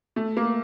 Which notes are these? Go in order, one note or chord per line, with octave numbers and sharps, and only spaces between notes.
A3
A#3